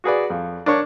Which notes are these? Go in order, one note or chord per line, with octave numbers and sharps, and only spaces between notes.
F#4 G#4 B4 D5
F2
D4 A#4 C#5 C#6